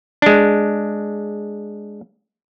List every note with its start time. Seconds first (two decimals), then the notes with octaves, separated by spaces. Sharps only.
0.22 G#3 D4